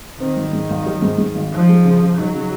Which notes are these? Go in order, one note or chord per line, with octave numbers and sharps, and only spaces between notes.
D#3 C4
G#1
G#2
G#1
F#3
G#2
G#2
G#1
F3 D#4
G#3
C#3
C#3
F#3 D#4
C#3